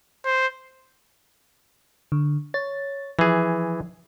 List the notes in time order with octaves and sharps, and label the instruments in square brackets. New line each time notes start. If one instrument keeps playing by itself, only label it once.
[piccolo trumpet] C5
[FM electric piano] D3
C#5 A6
[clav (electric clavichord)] E3 G#4 [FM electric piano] F3